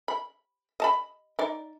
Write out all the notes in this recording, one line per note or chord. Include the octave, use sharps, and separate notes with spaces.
B5
D#5 A5 B5
D#4 D5